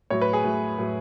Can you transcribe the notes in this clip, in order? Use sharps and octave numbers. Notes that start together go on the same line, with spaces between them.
A2 F#3 C#5
B4
G#4
A2 F#3
A2 F#3